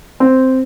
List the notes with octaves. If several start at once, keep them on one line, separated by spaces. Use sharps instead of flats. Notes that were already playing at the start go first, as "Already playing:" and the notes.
C4